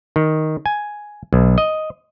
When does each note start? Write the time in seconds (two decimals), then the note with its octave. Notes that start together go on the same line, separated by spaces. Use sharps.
0.16 D#3
0.66 G#5
1.33 B1
1.58 D#5